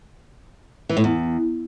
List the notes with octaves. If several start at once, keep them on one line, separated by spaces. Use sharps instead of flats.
E3
A2
E2